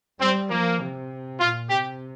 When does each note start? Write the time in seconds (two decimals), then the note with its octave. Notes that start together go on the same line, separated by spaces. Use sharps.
0.20 G3 C4
0.50 F3 A#3
0.80 C3
1.40 A#2 F4
1.70 C3 G4